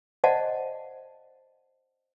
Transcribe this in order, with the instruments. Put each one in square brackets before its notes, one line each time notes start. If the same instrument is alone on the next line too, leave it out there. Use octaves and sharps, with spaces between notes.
[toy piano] C5 D5 D#5 F5 F#5 A5